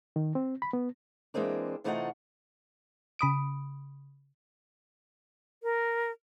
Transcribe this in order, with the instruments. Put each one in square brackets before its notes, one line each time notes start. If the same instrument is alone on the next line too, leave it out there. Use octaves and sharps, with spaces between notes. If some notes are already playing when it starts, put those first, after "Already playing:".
[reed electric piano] D#3
C4
B5
B3
[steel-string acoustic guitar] E3 G#3 A#3 C4 D4
C3 E3 A3 D#4 F4 F#5
[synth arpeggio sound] C#3 B5 D#6 D7
[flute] A#4